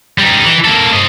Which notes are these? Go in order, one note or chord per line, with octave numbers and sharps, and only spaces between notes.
G3 D#4
E3
A#3 A4
C5 D#5